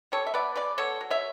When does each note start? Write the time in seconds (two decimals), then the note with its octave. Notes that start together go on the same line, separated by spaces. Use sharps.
0.12 G3 A4 C#5
0.27 E5
0.34 B3 B4 D5
0.56 C#3 B4 D5
0.78 B3 A4 C#5
1.01 F#3
1.10 C#5 E5